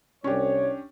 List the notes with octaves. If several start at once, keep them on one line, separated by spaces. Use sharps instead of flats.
C2 C#4 D4 G4 C#5